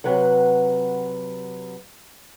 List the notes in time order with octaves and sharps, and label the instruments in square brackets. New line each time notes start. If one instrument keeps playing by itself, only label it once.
[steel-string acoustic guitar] C3 F#3 B4 F#5